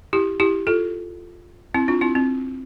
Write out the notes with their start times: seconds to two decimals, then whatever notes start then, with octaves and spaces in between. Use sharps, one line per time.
0.13 E4 G4
0.40 E4 G4
0.67 F4 A4
1.74 C4 E4
1.88 D4 F4
2.01 C4 E4
2.15 C4